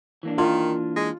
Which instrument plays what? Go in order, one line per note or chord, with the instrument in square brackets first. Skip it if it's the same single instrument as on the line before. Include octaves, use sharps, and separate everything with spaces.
[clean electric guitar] E3 A#3 D4
[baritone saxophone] D#3 [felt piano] F4
[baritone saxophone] G#3